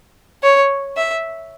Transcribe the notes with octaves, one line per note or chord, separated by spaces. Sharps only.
C#5
E5